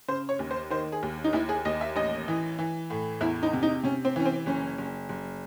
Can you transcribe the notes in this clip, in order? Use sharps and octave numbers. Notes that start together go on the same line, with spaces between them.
C#3 C5
C#5
D#2
C5
D#3 C5
G#4
D#2
D#4
D#2 E4
G#4
D#2 D#5
E5
A1 D#5
E3
E3
A2
E2 E4
D#4
C3
D#4
C3 C#4
C4
E3 C#4
C4
F#1 C#4
F#1
F#1